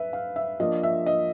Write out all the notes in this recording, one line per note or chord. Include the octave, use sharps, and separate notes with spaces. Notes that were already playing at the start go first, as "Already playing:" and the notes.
Already playing: B4 E5
F5
E5
F3 A#3 D4 D#5
E5
D#5